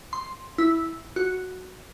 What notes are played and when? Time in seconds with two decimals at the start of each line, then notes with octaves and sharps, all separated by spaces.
0.13 C6
0.58 E4
1.16 F#4